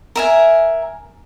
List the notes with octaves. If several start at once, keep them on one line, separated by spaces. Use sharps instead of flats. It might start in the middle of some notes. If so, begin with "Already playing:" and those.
A#4 E5 G#5